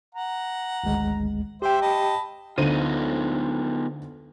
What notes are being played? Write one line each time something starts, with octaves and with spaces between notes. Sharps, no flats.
F#5 A#5
G#1 D2 G#3
G4 C5 E5 G5
D#5 A5 B5
D2 B3 D#4 F4 C5 D#7